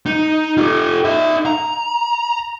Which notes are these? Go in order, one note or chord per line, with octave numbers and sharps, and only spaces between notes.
D#4
F4 G4
D#4 E5
A#5